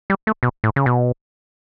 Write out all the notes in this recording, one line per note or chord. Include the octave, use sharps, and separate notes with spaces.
G3
A3
B2
A2
C#3
B2